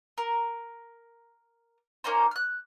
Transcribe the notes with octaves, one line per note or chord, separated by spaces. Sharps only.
A#4
A#3 C#4 D#4 C5
F6 F#6